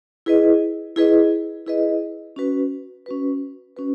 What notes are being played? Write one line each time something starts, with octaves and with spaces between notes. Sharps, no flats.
E4 G#4 B4 D#5
E4 G#4 B4 D#5
E4 G#4 B4 D#5
C#4 F#4 B4
C#4 F#4 B4
C#4 F#4 B4